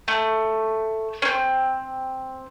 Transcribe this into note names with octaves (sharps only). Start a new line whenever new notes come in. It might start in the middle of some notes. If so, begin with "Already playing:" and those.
A3
C4 C#4